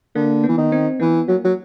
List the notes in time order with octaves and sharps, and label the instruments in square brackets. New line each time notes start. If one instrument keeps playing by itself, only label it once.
[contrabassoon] D3 [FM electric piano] A#3
[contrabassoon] E3 [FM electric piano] B3
[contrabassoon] D#3
[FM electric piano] C4
[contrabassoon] E3 [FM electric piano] B3
[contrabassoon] F#3 [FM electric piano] A#3
[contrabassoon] F#3